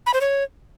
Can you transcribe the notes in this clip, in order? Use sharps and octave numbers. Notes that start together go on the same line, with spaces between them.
B5
C5
C#5